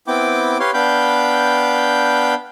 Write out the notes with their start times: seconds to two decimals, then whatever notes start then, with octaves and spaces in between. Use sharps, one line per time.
0.08 B3 C4 E4 G5 D6
0.60 G4 B4 C#5 F5 C6
0.74 B3 D4 F5 G5 B5 G6